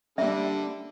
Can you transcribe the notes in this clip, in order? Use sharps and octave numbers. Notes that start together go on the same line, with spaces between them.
D3 G3 A#3 C#4 E5